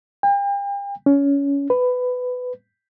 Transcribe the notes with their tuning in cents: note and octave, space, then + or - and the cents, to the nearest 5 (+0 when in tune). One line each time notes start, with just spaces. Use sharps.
G5 +40
C#4 +20
B4 +15